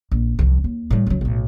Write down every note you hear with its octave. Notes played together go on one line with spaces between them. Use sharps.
A#1
C2 F3
D#2
A2 G3
C#2 F#3
B1 A2